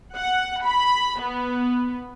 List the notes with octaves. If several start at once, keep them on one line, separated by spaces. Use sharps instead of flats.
F#5
B5
B3